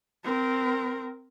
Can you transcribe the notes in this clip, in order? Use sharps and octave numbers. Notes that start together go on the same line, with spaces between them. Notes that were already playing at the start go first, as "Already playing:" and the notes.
C4 A#4